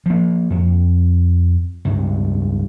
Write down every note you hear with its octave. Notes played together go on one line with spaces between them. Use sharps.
F3 A#3
F2
C#2 G2